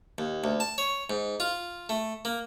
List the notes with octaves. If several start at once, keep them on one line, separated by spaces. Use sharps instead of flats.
D#2
D2
A5
C#5
G#2
F4
A3
A#3